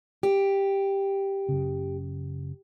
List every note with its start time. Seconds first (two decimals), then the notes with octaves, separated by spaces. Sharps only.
0.23 G4
1.49 F#1 C#3